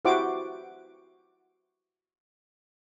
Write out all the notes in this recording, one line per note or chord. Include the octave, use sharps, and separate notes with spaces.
E4 F#4 G4 C5 F#5 D6